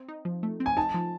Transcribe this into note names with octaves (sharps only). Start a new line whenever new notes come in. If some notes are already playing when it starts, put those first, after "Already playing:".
Already playing: C4
D#4
F3
A3
C4
G#5
D#4 A5
F3